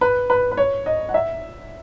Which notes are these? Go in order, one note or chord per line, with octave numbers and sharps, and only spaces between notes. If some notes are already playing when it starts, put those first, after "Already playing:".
B4
B4
B4
C#5
D#5
F#5
E5